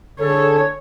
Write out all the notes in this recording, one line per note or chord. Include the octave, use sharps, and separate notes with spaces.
D3 G#4 A4 C#5